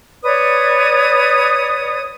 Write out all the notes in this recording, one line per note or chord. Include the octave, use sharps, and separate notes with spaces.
B4 C#5 D5 D#6